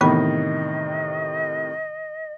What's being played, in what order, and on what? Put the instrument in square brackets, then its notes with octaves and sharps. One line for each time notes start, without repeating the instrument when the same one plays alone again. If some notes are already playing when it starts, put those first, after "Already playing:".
[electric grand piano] A2 C3 D#3 [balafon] E3 B3 B5 [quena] D#5